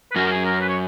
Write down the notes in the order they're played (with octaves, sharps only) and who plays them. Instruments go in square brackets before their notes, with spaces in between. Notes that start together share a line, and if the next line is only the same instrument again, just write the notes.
[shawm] B4
[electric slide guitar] F#2 F#3 [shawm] A#4
[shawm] A#4
G#4
A#4
B4
C#5